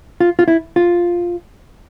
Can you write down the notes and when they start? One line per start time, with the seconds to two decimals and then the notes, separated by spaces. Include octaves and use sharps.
0.20 F4
0.39 F4
0.48 E4
0.76 F4